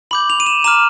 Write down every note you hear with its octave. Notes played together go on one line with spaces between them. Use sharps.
B5 D6 G6 F#7
F7
D#7
E7
A#5 D6 F6 E7